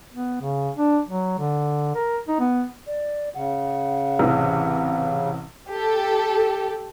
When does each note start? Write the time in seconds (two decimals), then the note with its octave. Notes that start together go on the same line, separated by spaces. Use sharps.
0.13 B3
0.42 C#3
0.77 D4
1.09 F#3
1.38 D3
1.95 A#4
2.28 D#4
2.40 B3
2.87 D5
3.35 C#3 F#5
4.19 A1 C3 E3
5.71 G4 A4